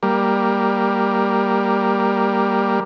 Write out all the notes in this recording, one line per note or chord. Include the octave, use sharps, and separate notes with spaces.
G3 A#3